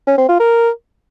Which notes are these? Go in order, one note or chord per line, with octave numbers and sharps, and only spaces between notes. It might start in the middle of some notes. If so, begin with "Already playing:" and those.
C#4
C4
F4
A#4